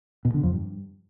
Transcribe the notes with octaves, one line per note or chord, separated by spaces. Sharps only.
B2
D3
F2
G2